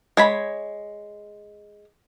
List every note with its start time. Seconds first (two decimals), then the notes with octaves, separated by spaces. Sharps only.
0.17 G#3 C#5 B5